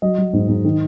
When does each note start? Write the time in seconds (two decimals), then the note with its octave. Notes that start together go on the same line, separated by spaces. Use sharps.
0.02 F#3 D#5
0.18 F#3
0.33 G#2
0.48 G#2
0.64 D#3